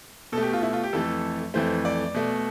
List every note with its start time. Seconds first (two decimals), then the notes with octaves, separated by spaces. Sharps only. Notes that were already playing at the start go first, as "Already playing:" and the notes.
0.32 B2 A4
0.38 A3 G4
0.53 F4
0.63 E4
0.73 F4
0.83 G4
0.93 F2 E3 A3 A4
1.54 F2 E3 A3 C5
1.85 D5
2.14 B2 A3